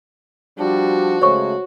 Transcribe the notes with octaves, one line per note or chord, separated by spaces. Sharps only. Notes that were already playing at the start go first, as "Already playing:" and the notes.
F3 G3 D4 F#4
C#3 G#3 A3 C5 C#5 C#6